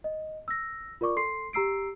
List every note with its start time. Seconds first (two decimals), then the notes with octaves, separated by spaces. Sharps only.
0.04 D#5
0.48 E6 A#6
1.01 F4 A#4 D5 C#6 D6
1.16 A4 C6 C7
1.53 G4 A#5 E6 C7 D7